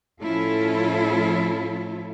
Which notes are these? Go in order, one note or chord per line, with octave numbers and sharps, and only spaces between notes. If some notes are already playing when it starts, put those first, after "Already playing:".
A2 F3 C#4 E4 F4 A4